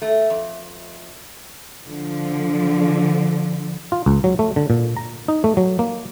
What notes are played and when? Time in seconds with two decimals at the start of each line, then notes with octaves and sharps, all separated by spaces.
0.02 A3
0.30 F2
1.86 D3 F3
3.92 F4
4.06 C#2
4.24 F#3
4.39 A3
4.56 D3
4.70 A#2
4.97 A#5
5.28 D#4
5.44 A3
5.57 F#3
5.79 A#3